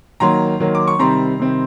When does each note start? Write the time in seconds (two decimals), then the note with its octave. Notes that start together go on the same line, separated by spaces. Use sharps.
0.20 D#3 F#3 A#3 A#5 C6
0.60 D#3 F#3 A#3
0.75 D6
0.87 C#6
0.99 C3 D#3 G3 C4 A#5 C6
1.39 C3 D#3 G3 C4